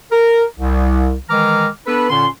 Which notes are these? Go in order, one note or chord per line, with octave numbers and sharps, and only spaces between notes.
A#4
C2
D#3 E3 G#3 A#5 D6 F6
B3 D4 A4 B4
A#2 D3 C#4 C6